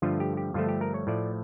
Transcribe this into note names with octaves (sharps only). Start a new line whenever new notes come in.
G2 D3 F3 A3 F4
G4
G4
G2 D3 F3 A3 F4
G4
A#4
C#5
A2 F3 A3 D5